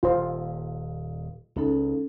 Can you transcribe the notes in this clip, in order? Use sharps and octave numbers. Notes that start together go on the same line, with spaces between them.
D#1 D#2 F4 C5
C#2 C#4 D#4 A4